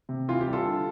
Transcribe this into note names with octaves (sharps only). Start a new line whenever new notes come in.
C3
E3 F4
G4
G3
F4 A4
D3